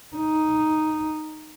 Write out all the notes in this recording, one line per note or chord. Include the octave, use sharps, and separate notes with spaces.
D#4